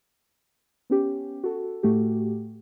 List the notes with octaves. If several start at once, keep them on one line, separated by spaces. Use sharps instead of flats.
B3 C#4 G4
F#4 A4
A2 A3 F#4 G4